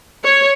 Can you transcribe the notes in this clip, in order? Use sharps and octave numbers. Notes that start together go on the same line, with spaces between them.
C#5